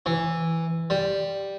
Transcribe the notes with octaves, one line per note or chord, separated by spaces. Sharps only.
E3
G3